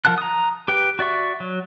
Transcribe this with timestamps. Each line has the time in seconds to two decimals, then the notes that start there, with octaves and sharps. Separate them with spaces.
0.05 F3 A#4 F#5 A5 F#6
0.18 A#5 D#6
0.68 G4 B4 G5
0.99 F#4 D5 E5 C#6
1.40 F#3